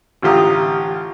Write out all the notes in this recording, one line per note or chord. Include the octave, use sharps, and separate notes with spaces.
A1 D3 F4 G4 A#5 D#6